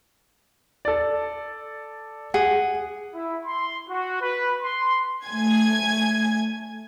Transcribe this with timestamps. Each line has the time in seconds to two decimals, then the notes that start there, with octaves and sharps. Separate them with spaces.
0.85 A4 D5
2.34 G#4 F#5
3.15 E4
3.46 C6
3.89 F#4
4.21 B4
4.62 C6
5.26 A3 G#5 G#6